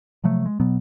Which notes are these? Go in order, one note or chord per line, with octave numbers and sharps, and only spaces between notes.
C3 F3 F#3 A3
G#3
B2 F#3 B3